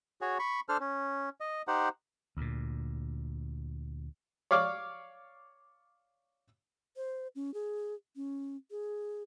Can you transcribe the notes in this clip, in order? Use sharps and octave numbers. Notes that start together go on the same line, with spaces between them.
F#4 G#4 C#5
B5 C#6
D4 A4 C5 F6
C#4
D#5
D#4 G4 C5 F#5
D2 A#2
C#5 D5 F5 D6
C5
C#4
G#4
C#4
G#4